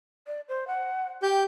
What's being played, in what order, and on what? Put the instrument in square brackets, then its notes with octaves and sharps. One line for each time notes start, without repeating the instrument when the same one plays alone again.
[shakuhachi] D5
C5
F#5
[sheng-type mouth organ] G4 G6 [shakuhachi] G5